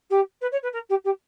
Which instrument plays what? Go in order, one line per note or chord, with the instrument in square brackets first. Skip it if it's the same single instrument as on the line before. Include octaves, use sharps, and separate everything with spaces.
[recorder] G4
B4
C#5
B4
A#4
G4
G4